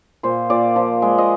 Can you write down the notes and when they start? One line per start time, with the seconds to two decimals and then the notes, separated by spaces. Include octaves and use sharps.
0.23 A#2 C5
0.50 A#2 D5
0.76 F3
1.02 G#3
1.18 D#5